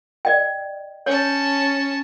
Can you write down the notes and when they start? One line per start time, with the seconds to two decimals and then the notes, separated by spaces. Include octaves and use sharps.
0.25 D5 D#5 G5
1.06 C#4 C#5 A5